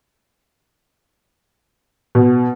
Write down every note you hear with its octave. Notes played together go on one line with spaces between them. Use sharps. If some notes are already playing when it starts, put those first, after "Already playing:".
B2